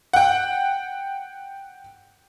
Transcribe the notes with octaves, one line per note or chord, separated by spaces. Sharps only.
F#5 G5